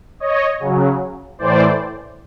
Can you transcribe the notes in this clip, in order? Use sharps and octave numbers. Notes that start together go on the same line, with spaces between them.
C#5 D#5
C#3 F#3
A2 E3 C5 D5